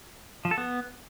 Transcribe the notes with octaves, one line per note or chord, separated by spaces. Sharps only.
F3
A4
B3